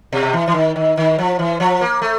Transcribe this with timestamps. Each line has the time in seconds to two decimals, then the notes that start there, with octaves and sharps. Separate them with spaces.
0.12 B2
0.33 E3
0.48 E3
0.54 D#3
0.76 D#3
0.97 D#3
1.19 F3
1.39 E3
1.60 F3
1.81 A#3
2.02 A3